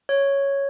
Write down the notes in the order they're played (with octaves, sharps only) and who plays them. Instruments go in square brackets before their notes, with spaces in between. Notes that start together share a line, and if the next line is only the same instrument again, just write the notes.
[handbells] C#5